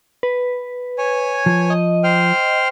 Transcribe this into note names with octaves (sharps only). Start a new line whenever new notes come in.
B4
C#5 G#5
F3
D#5
C5 G5 F6